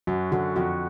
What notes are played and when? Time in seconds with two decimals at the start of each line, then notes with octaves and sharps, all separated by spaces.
0.07 F#2 F#4
0.31 D3 F#4
0.56 F2 F#4